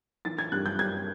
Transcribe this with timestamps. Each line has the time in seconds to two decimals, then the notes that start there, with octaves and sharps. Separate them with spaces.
0.25 E3 A6
0.39 G#6
0.52 G2 F#6
0.66 G6
0.79 G2 G#6